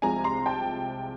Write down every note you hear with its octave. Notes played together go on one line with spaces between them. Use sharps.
C2 C3 F3 G#3 G#5 A#5
A#5 C6
G5 A5